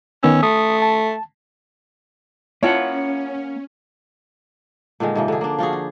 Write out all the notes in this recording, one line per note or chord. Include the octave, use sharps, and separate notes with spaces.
D#3 B3 C#4 E6
A3 D#6
A5
A#3 C#4 E4 F4 C#5 F#5 A5
A#2 D3 D#3 G#3
G#2 C3 F3
D3 G#4
A#3 D4
F3 F4 F#4 G#4
F4